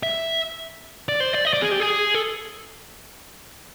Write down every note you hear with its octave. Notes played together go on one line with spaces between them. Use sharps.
E5
D5
C5
D5
D#5
D5
G#4
G4
G#4
A4